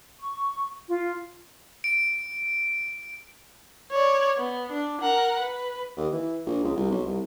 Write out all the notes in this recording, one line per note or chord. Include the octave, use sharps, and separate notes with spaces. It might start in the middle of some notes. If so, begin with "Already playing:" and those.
C#6
F4
D7
C#5 D5
B3
D4
A#4 F#5
B4
D#2
E3
A#1
C#2
C2
B1
C2